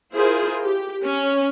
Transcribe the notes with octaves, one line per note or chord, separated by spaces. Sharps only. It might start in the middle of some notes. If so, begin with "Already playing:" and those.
E4 F4 G#4 A#4 C5
G4
C#4